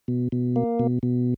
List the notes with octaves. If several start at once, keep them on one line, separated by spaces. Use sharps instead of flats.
B2
B2
A#3
B2
B2